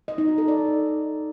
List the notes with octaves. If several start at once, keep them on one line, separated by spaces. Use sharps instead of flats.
D#5
D#4
F#4
A4
D5